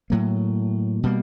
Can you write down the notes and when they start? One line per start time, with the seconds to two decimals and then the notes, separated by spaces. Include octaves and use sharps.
0.10 A2 F#3 A#3
1.03 B2 G3 A#3